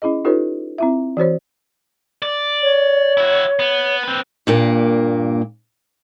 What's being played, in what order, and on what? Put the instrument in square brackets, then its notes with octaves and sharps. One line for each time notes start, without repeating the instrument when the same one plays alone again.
[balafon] C#4 E4 G#4 D#5
D#4 F4 G4 A4 B4 C#5
C4 E4 E5
E3 F#4 C5 C#5
[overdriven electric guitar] D5
[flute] C#5
[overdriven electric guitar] E4 F#4
B3
C4 B4
[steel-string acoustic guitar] G2 A#2 A#3